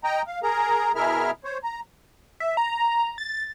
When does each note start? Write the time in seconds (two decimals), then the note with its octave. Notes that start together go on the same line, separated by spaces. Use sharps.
0.04 D#5 G5 A#5
0.27 F5
0.43 G#4 A#4 A#5
0.95 B2 E4 G#4 A#4 E5 F6
1.44 C5 C#5
1.64 A#5
2.40 E5
2.57 A#5
3.18 A6